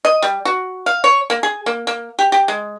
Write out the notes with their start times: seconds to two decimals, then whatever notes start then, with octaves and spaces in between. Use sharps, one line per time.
0.05 D#5
0.22 G3
0.45 F#4
0.86 F5
1.04 C#5
1.30 A#3
1.43 G#4
1.66 A#3
1.87 A#3
2.19 G4
2.32 G4
2.48 G#3